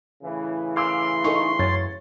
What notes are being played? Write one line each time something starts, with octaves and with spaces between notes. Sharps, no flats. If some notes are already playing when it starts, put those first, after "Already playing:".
A2 C#3 E3
F5 C6 D6 E6
D#4 A4 C#6
F#2 C#5 A6